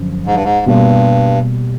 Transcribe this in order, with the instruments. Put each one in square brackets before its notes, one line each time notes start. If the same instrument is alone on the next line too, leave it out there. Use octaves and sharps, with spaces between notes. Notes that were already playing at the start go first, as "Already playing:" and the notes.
Already playing: [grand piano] F#2 D3 F3
[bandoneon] G#2
G2
G#2
[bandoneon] G2 [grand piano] B2 G3 A#3